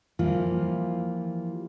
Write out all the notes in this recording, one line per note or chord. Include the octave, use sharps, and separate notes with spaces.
E3 F3 G3 A#3 F4